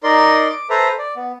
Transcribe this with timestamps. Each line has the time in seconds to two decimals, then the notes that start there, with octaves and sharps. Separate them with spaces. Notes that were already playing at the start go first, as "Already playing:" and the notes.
0.04 D#4 A#4 D5 C6
0.50 D6
0.70 A4 B4 C5 E5 A#5
0.99 D5
1.16 B3